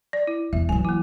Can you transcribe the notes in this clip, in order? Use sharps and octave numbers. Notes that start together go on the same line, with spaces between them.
D5
E4
E2 E5
E3 F#3 G#5
A#3 E4